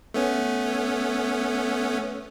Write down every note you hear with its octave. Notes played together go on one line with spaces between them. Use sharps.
A3 B3 C#4